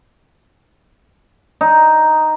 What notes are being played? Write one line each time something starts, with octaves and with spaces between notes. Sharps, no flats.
D#4